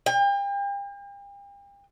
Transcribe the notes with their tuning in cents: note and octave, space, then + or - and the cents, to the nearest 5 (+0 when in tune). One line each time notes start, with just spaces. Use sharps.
G5 +40